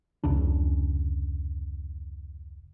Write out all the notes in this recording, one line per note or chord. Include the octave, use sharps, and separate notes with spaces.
F1 C#2 C#3 D4